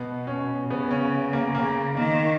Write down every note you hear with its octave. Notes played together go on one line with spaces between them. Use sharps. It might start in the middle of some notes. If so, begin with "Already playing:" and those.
Already playing: B2 B3
C#4
C#3 B3
C#4
A#3
C#3 A#3
D#3 A#3